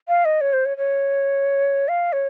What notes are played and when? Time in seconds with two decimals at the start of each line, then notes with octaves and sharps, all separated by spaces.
0.08 F5
0.25 D#5
0.41 C#5
0.53 C5
0.66 C#5
0.77 C#5
1.88 F5
2.13 C#5